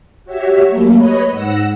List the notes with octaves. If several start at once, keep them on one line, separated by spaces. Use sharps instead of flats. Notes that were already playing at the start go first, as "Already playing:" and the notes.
F#4 G4 C#5 E5
F#3 G3 A3 A#3
B4 C#5 D#5 B5
G#2 F#5 E6 A#6